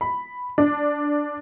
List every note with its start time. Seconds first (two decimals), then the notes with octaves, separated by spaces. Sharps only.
0.01 B5
0.58 D4